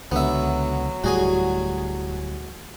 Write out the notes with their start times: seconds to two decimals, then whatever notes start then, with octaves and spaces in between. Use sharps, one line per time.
0.12 C#2 D3 F#3 B3 E5
1.04 D1 A2 G3 F#4 G#4 G#5